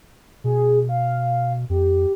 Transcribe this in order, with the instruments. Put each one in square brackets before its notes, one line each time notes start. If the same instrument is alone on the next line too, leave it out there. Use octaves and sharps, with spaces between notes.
[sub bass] B2 [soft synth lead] G#4
[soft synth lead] F5
[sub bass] F2 [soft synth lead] G4